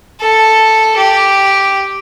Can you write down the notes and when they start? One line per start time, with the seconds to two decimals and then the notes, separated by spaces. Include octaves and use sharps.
0.21 A4
0.97 G4